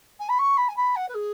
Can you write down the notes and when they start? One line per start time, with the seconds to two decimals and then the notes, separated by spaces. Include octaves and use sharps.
0.19 G#5
0.29 B5
0.38 C#6
0.57 B5
0.68 G#5
0.76 B5
0.96 F#5
1.08 B4
1.14 G#4